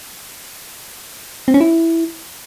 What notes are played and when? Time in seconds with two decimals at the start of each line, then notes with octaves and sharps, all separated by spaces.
1.48 C4
1.54 C#4
1.61 E4